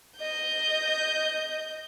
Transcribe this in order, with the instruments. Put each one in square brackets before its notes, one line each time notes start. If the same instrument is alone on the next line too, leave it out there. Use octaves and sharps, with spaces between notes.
[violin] D#5 G6